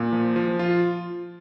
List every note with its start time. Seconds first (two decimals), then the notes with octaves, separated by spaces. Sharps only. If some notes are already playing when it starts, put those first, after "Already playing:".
Already playing: A#2
0.13 F3
0.36 F3
0.59 F4